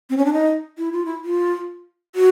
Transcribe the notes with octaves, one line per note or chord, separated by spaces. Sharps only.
C4
C#4
D4
D#4
E4
F4
E4
F4
F#4